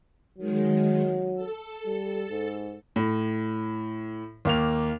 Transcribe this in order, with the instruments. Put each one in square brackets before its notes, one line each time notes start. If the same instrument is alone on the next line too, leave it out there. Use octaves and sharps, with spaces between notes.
[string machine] D#3 G#3 [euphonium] F#3
[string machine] A4
[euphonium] G3
G#2
[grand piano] A2
D#2 A#3 F7